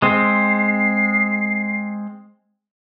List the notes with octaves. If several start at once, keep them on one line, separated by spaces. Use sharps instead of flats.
G#3 C4 C7